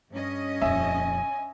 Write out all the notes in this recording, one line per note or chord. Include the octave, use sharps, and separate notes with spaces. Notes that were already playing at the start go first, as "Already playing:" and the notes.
G2 C#4 D#5
D#1 F2 E5 G#5